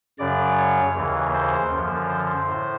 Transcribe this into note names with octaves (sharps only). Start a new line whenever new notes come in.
F#2 C#3 F#3 D5
C#5
D#2 C#3 E3
C5
F#2 D3 F3
C5
A2